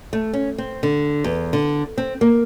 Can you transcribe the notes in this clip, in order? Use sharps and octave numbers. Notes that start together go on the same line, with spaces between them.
A3
C#4
C4
D3
E2
D3
C4
A#3